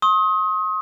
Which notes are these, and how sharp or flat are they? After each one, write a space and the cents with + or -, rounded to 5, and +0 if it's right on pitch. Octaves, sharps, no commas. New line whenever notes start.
C6 +45 D#6 +30